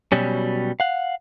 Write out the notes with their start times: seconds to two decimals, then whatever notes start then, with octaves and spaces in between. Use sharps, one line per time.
0.12 B2 F#3 G3 C#4
0.80 F5 F#5